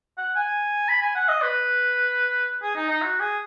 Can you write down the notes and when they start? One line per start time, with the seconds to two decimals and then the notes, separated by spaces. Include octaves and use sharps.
0.18 F#5
0.36 G#5
0.89 B5
1.02 G#5
1.15 F#5
1.29 D#5
1.42 B4
2.62 G#4
2.75 D#4
2.89 D#4
3.02 F#4
3.20 G#4